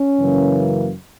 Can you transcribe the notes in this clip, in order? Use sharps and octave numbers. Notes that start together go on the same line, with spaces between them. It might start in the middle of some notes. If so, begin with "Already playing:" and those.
Already playing: C#4
F#2 C#3 E3 A#3